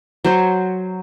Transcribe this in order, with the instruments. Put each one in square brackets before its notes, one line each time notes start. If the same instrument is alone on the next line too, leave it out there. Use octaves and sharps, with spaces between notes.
[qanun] F#3 C5 C#5